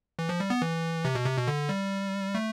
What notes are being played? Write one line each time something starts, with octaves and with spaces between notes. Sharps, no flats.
E3
F3
G3
B3
E3
C3
B2
C3
B2
D3
G3
A3